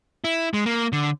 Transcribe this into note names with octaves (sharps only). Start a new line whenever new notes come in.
E4
G#3
A#3
D3